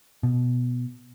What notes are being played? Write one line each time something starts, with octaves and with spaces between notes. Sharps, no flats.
B2